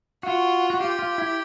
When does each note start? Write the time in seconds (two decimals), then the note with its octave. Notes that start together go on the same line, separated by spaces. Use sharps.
0.23 F4 F#4
0.70 F#4
0.80 F4 G4
0.99 F4
1.18 E4